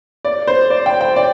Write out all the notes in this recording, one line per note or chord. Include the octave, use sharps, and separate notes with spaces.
D5
C5
D5
G5
G5
D5